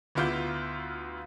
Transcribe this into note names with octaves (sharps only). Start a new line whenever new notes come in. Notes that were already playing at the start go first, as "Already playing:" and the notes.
D2 B3 E4 F4 D6 G6